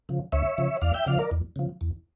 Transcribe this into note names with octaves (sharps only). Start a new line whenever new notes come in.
C#3 F3
D2 C#5 E5
C#3 F3
E2 D5 F5
E5 G5
C#3 F3 D5 F5
A#4 D5
E2
C#3 F3
E2